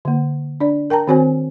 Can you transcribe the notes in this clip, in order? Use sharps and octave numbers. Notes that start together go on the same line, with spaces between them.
D3 A#3
D4 D5
A#4 G5 A5 A#5
D#3 C4 F#4 C5 C#5 G#5